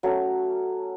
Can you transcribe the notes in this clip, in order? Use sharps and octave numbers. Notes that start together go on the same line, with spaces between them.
F#3 A3 C#4